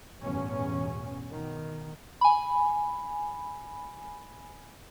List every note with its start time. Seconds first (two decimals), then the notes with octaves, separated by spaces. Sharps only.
0.23 A1 E2 G2 B2 C#4
1.29 B2 D#3
2.21 G#5 B5